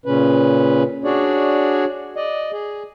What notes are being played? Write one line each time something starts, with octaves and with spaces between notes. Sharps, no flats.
A#2 C#3 C#4 B4
D4 F#4 G#4 C#5 D5
D5 D#5
G#4